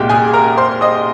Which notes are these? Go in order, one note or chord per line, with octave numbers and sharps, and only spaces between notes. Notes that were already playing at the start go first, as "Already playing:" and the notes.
Already playing: C2 A#2 G#3 G4 G5
G#4 G#5
A#4 A#5
C5 C6
D#5 D#6